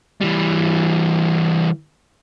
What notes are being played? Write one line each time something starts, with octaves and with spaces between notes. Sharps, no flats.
E3 G3